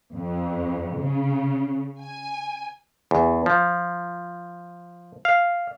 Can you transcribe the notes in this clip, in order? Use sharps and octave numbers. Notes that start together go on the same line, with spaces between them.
F2
C#3
G#5
E2
F3
F5